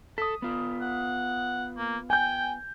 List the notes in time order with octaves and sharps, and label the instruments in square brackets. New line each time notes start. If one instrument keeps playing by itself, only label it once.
[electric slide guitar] A4 [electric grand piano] D#6 B6
[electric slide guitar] B3 F4
[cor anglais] F#5
A#3
[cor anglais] G5 [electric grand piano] G#5 G6